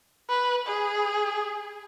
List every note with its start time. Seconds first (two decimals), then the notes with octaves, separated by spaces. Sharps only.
0.29 B4
0.67 G#4